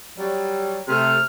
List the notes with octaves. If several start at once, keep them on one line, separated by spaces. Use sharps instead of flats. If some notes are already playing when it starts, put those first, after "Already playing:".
F#3 G3
C3 A3 F6